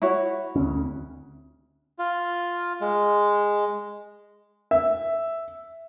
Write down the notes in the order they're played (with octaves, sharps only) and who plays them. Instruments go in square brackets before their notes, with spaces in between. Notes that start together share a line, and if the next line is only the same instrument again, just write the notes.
[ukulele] E4 F#4 C#5
[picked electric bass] D2 C4 C#4
[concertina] F4
G#3
[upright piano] E5